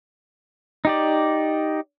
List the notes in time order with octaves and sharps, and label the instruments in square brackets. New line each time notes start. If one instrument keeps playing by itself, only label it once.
[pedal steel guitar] D#4 G4 D5